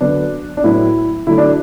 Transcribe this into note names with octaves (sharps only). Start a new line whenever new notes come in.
D3 F#3 B3 D4
D4
A2 F#3 B3 E4
D3 F#3 A3 E4
D4